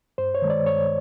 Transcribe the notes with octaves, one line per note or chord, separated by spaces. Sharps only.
G2 C5
C#5
D#3 G#3
D5
G2 C#5